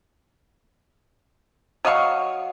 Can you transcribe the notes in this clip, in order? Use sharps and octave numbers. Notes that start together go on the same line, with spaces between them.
F#3 D#5 F5 C#6